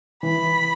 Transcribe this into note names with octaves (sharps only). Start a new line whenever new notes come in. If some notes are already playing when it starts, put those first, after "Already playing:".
E3 B5